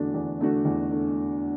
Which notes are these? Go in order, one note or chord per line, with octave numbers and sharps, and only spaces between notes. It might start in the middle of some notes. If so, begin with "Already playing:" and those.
Already playing: E2 D3 A3 D4 F#4
E2
D3 A3 D4 F#4
E2
D3 A3